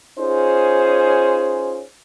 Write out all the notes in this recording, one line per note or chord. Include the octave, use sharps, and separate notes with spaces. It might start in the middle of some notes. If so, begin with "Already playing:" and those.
C#4 D#4 F4 G#4 C5